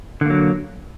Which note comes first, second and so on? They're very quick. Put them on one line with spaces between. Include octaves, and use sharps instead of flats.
D3 A#3 F#3